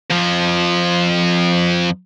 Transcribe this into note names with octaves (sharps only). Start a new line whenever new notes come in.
F2 F3